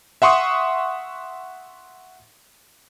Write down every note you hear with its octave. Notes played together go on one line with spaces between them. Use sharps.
E5 F#5 C6 C#6 D#6